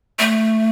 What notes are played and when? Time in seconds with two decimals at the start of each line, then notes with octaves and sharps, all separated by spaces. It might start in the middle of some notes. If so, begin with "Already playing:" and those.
0.19 A3